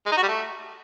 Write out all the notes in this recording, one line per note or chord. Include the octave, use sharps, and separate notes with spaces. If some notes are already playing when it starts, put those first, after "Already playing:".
G#3
D#4
F#4
G3
A3